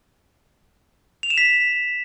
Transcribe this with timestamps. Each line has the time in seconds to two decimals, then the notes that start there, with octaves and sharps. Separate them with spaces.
1.23 F7
1.30 E7
1.38 B6